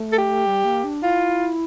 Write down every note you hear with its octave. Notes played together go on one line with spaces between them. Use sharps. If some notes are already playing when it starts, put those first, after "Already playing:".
Already playing: A3
A4
G4
G3
A#3
D4
E4 F4